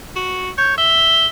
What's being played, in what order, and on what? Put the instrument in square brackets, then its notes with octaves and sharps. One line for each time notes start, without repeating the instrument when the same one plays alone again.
[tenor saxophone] F#4
[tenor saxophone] C#5 [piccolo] G6
[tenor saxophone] E5 [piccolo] G7